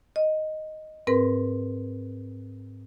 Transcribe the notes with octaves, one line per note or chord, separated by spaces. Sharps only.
D#5
G#2 C4 A#4 B4